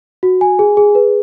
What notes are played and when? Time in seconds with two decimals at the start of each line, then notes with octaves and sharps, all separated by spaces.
0.23 F#4
0.41 G#5
0.59 G#4
0.77 G#4
0.95 B4